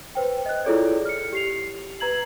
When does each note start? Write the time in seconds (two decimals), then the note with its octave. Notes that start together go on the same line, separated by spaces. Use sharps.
0.15 B4 C5 G5
0.46 D#5 F#6
0.65 E4 F4 G#4 A4 C#5 D5
1.05 F6 C#7
1.33 G4 C7 F7
2.00 B4 A#5 G#6 F#7